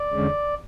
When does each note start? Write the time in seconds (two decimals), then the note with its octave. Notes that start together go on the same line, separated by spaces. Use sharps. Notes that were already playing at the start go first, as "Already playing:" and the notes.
Already playing: D5
0.13 E2 D3 G#3 C#4